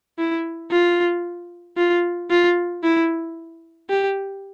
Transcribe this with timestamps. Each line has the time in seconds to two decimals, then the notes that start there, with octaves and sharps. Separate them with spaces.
0.18 E4
0.71 F4
1.77 F4
2.30 F4
2.83 E4
3.90 G4